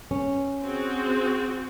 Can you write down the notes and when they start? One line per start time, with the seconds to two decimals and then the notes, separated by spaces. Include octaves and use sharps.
0.11 C#4
0.62 C4 F#4 G#4